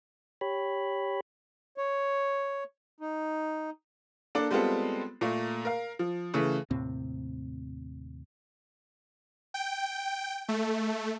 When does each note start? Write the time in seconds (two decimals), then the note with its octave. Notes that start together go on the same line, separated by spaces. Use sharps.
0.41 G4 C#5 B5
1.78 C#5
3.00 D#4
4.35 A#3 D4 A4 D6
4.51 G3 G#3 B3 C4 F4 A4
5.21 A#2 A3 A#3
5.65 A#4 F5
5.99 F3
6.34 C#3 E3 A3
6.71 D#2 A2 C3 C4
9.54 G5
10.49 A3